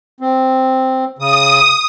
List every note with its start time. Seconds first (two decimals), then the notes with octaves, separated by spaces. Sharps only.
0.20 C4
1.19 C#3 D#6